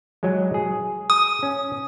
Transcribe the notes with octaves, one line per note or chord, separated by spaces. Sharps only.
F#3 G#3
G#4
D#6
C#4